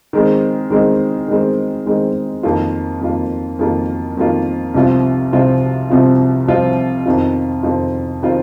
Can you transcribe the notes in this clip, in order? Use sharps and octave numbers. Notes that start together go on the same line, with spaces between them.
D#3 G#3 C4
D#3 G#3 C4
D#3 G#3 C4
D#3 G#3 C4
F2 D#3 A#3 F4
F2 D#3 A#3 F4
F2 D#3 A#3 F4
F2 D#3 A#3 F4
C2 C3 F3 C4 F4
C2 C3 F3 C4 F4
C2 C3 F3 C4 F4
C2 C3 F3 C4 F4
F2 D#3 C4 F4
F2 D#3 C4 F4
D#3 C4 F4